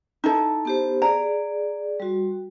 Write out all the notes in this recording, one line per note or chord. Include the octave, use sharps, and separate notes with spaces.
D#4 E4 A4
B3 G4 C5
G#4 D5 A#5
G3 F#4